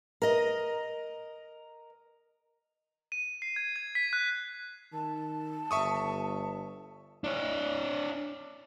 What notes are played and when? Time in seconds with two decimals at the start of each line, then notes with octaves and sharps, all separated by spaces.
0.22 A#4 D#5
3.12 D#7
3.42 C7
3.56 G#6
3.76 G#6
3.95 B6
4.13 F#6
4.93 D#3 A5
5.71 G1 E5 C#6 D#6
7.24 D4 C#5